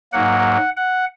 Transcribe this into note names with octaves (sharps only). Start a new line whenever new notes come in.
G#2 F#3 A#3 F#5
F#5